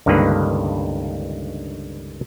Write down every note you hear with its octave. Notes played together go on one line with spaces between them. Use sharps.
C#2 G2 D3 D#3 A#3 B4